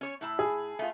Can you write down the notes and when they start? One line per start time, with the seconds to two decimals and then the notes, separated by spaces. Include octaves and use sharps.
0.01 C#4 C#5
0.21 A2 E4 A5
0.39 G#4
0.79 A3 F4